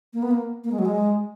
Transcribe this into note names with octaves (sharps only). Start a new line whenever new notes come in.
A#3
B3
A#3
A#3
G#3
F#3
G#3